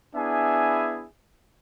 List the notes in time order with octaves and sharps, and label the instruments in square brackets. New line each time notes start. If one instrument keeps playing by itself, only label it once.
[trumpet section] B3 D4 E4 G#4 E5 G#5